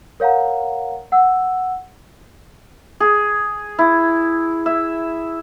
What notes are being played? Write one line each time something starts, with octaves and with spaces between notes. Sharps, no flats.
A#4 C#5 F5 F#5 A#5
F#5 E6
G#4
E4
E5